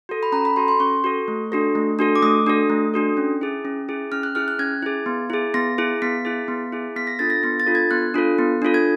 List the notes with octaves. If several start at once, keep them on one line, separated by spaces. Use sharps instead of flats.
F#4 A4
B5
C#4 A#5
B5
F#4 A4 C6
C6
C#4 C#6
F#4 A4
A3
D4 F#4 A4
A3
D4 F#4 A4
D6
A3 D#6
D4 F#4 A4
A3
D4 F#4 A4
C#4
E4 G#4
C#4
E4 G#4
C#4 F6
F#6
E4 G#4 F6
F#6
C#4 G#6
E4 G#4
B3
E4 G#4
B3 A#6
E4 G#4
B3 B6
E4 G#4
B3
E4 G#4
B3 B6
A#6
D4 F4 A4 A6
A#6
B3 A#6
A6
D4 F4 A4
G#6
B3 F#6
D4 F4 A4
B3
D4 F4 A4
G#6